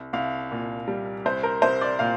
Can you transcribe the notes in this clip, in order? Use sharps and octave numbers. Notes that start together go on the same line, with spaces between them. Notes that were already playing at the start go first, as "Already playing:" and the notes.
Already playing: C2
C2 F5
A#2
G3
C2 C5
A#4
C2 C5
D5
A#2 F5